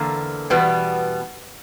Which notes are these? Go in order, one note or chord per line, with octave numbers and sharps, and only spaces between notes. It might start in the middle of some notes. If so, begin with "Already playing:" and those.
Already playing: E2 D3 A#3
E2 B2 G3 B3